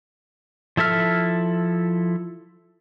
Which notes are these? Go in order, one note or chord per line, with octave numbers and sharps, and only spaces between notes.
F3 E4 A4 E5 F6